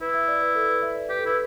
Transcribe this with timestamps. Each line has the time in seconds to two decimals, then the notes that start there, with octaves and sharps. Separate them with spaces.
0.01 E4 B4
0.14 E5
0.28 D5
0.41 B4
0.55 A4
0.69 B4
0.82 E5
0.95 D5
1.09 G4 B4
1.19 A4
1.26 E4 B4